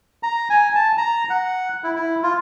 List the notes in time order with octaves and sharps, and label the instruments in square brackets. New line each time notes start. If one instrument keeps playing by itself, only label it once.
[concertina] A#5
G#5
A5
A#5
F#5
E4
E4
F4